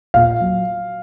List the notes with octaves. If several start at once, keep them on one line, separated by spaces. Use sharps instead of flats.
A#2 F5
F#3